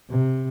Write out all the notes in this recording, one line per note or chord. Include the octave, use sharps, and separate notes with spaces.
C3